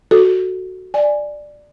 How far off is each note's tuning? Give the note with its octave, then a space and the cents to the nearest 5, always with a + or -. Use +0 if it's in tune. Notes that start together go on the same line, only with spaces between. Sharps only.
F#4 +0 A4 +0
D5 +5 G#5 +0